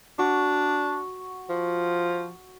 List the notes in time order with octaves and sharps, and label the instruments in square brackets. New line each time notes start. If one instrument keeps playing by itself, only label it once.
[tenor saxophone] D4 [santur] F#4
[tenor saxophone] F3